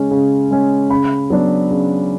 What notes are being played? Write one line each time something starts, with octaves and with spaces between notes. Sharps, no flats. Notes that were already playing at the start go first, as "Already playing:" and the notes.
Already playing: C#3 G#3 C#4
C#3
G#3 C#4
C#3 B5
F#3 B3 D4
C#3